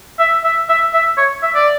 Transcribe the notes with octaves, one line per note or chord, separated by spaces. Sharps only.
E5
E5
E5
E5
C#5
E5
D5